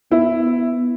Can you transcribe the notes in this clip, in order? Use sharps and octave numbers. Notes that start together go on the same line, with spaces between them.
B3 E4